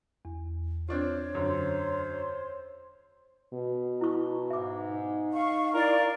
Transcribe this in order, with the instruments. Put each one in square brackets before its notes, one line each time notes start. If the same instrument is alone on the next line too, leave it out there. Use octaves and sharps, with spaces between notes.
[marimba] E2
[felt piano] C4 D4 F4 [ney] C#5
[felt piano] F#2 D3 [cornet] C5
[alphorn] B2
[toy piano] E4 C#6
[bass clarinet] G#2 [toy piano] E5 D6
[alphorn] D#4
[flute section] F5 C#6
[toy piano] E4 [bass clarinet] A#4 [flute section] D5 F5